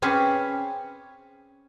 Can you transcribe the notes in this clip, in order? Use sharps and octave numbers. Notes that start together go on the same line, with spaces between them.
C4 C#4 G#4 B4 C#5